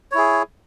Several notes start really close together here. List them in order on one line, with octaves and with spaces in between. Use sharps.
C#5 E4 G#4